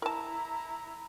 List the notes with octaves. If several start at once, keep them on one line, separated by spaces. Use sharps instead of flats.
E4 A#4 A5 A#5